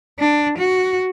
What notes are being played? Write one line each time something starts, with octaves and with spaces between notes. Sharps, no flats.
D4
F#4